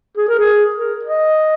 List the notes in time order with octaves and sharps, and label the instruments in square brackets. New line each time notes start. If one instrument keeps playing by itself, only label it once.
[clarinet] G#4
A#4
G#4
A#4
D#5